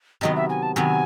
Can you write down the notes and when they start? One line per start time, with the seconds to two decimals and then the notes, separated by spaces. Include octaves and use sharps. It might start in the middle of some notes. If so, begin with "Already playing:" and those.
0.21 C3 D#3 F#3 B3 D#5
0.36 E5
0.50 G#5
0.62 A5
0.76 C3 D#3 F#3 B3 G#5